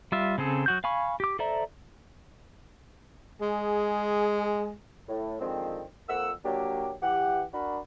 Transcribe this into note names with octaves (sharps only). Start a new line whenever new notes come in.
G3 F4 E5
C#3 C4 G#4 A4
F#3 F#4 G6
F5 G#5 B5 C#6
G4 D6
A4 C5 D5 E5 A#5
G#3 G#4
A2
D3 D#3 F3 G#3 C4
F2 A#3 F#5 E6
F#3 A#3 D4 G4
E3 G4 F#5
D4 F#4 A#4 B5